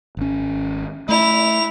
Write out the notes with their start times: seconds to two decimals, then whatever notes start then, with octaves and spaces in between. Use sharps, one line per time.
0.17 G#1 C#4
1.09 A3 E4 F7